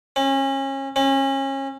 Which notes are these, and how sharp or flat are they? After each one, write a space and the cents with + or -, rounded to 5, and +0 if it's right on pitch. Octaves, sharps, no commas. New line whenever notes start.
C#4 -30
C#4 -30